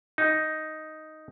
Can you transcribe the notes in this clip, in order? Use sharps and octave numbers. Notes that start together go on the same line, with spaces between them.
D#4